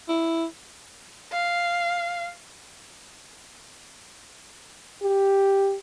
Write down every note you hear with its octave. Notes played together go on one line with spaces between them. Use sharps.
E4
F5
G4